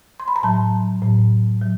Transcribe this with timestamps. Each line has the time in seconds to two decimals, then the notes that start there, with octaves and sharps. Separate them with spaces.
0.20 C6
0.28 B5
0.36 A#5
0.43 A2 F#3 A5
1.02 A2 F#3
1.61 F#3